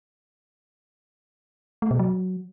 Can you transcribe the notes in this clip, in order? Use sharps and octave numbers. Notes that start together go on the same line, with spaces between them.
A3
B2
F#3